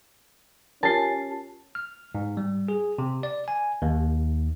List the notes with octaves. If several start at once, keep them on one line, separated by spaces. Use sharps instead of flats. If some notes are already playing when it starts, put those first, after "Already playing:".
C#4 F4 G4 A#4 A5 C7
F6
G#2
G3
G#4
C3
D5
G#5
D#2